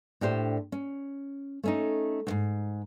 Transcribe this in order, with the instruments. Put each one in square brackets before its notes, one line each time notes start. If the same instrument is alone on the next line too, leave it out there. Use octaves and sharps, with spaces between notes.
[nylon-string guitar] A2 D4 G4 C5
C#4
A3 C#4 D#4
D2 G#2